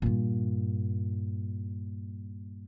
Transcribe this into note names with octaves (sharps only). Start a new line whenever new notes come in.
G2 A#2